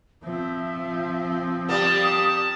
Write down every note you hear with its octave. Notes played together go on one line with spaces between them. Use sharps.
F3 C4 E5
G3 A#3 A5 D#6